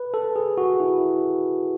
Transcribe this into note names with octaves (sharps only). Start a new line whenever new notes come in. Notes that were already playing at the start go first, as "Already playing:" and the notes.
Already playing: B4
A4
G#4
F#4
E4